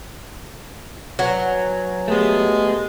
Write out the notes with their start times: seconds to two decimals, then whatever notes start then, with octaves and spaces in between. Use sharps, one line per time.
1.19 F#3 B4 G#5
2.08 G#3 A3 B3 G4